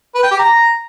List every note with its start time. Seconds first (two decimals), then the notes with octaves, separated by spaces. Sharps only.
0.15 B4
0.23 G5
0.31 G4
0.39 A#5